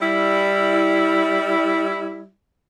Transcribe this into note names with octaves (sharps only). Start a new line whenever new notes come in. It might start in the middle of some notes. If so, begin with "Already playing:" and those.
G3 E4